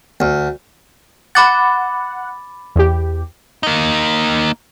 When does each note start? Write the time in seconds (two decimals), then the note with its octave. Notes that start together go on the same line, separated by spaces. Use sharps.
0.20 D2
1.35 F#5 B5 D6 A6
2.76 E2 G4
3.63 A#3 D#4